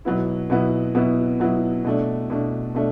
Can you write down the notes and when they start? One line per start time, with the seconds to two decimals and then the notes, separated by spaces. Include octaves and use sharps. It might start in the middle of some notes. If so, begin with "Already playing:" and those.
0.05 B2 F#3 B3 E4
0.50 B2 F#3 B3 E4
0.95 B2 F#3 B3 E4
1.40 B2 F#3 B3 E4
1.85 B2 A3 D4
2.30 B2 A3 D4
2.75 B2 A3 D4